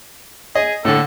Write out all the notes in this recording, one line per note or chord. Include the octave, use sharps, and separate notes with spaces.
G#4 D#5
A2 D3 A4